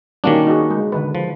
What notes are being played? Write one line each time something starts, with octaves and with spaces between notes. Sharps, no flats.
D#3 G3 A#3 C#4 D4 F#4
D#4 F#4 G#4
G#3
D3 D#3 B4
F3